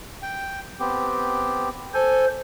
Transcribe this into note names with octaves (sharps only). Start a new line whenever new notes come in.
G5
B3 C4 G4
A4 C5 G#5